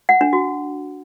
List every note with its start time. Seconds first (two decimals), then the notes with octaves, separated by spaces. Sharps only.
0.09 F#5
0.21 D4
0.33 F#4